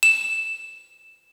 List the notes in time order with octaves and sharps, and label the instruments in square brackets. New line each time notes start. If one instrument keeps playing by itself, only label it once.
[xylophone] E7